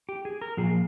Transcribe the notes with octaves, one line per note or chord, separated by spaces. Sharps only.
G4
G#4
A#4
A#2 F3 G#4